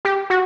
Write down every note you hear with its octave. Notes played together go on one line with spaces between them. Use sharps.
G4
F#4